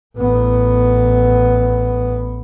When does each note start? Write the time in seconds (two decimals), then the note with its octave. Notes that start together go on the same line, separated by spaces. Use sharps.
0.18 A1 B3